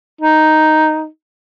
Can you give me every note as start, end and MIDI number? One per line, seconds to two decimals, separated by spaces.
0.21 1.06 63